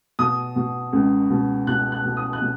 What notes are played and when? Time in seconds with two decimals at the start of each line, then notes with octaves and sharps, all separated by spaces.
0.19 B2 D#6
0.56 B2
0.93 C#2
1.30 B2
1.67 B2 F#6
1.92 F#6
2.05 B2
2.17 D#6
2.33 F#6
2.41 B2